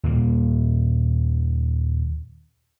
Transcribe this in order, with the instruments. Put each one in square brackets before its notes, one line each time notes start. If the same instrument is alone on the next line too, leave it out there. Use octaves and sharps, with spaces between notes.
[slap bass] D#2 A#2 A#3